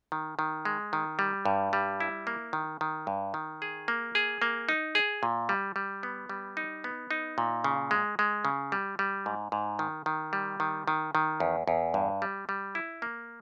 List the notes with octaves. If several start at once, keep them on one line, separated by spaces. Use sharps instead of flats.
D#3
D#3
G#3
D#3
G3
G2
G3
E4
A#3
D#3
D#3
G2
D#3
G#4
A#3
G#4
A#3
D#4
G#4
A#2
G3
G3
B3
G3
D#4
B3
D#4
A#2
C#3
G#3
G#3
C#3
G3
G3
G#2
G#2
D#3
D#3
G3
D#3
D#3
D#3
E2
E2
G2
G3
G3
E4
A#3